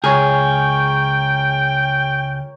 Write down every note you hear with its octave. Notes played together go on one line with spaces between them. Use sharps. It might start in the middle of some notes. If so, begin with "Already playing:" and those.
C#2 G#4 A#4 C#5 G5